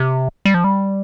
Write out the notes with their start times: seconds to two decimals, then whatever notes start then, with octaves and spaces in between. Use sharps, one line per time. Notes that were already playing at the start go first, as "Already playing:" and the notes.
Already playing: C3
0.45 G3
0.54 F3
0.64 G3